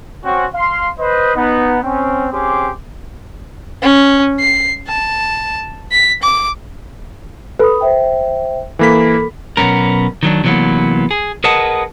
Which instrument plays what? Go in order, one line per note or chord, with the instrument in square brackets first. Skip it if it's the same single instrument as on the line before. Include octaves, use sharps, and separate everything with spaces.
[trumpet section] C4 C#4 F#4
F5 C6
B4 C5 D#5
B3 D#4
C4 C#4
C4 C#4 G4 G#4 C6 D6
[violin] C#4
C7
A5
B6
D6
[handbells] A4 B4 [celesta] B5 D#6
[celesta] C5 E5 G5
[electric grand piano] E3 A#3 B6 [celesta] A4 A#4 B5
[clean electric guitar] B1 G#2 B3 C#4 A#4
D#3 F#3 D4
C3 E3 F#3 G#3 A#3 B3
G#4
G#4 A#4 B4 D#5 F#5 A5